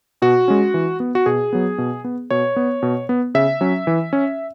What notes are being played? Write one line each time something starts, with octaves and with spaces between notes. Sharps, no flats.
B2 F#4
G#3 C#4
E3
B3
F#4
B2 G#4
F#3 B3
B2
B3
B2 C#5
B3
B2
B3
C#3 E5
F#3 C#4
E3
C#4